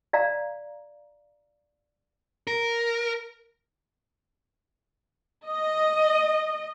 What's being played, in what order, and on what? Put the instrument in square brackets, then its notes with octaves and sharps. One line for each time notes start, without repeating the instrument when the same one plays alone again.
[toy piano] D5 F5 A#5
[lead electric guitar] A#4
[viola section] D#5